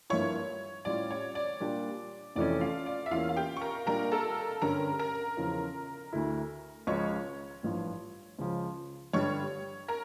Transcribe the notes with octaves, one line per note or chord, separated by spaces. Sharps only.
G2 F3 A#3 E4 C#5 C#6
A2 G3 C#4 F4 D5
C#5
D5
A#2 G3 D4 G4
F1 F2 E3 A3 C#4 D5
F4 F5
D5
E5
E2 E3 A#3 C#4 F4 F5
F5
G4 G5
C#6
A#4 A#5
A#2 G3 D4 A#4 A#5
A4 A5
G2 D3 G3 C#4 A#4 A#5
A#4 A#5
E2 C#3 F3 C#4
D2 D3 A3 E4
C#2 C#3 F3 C#4 F4 C#5 C#6
A1 G2 F3
C#2 C#3 F3
G2 D3 G3 C#5 C#6
A#4 A#5